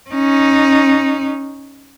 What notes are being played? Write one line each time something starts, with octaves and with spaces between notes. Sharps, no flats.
C#4 D#4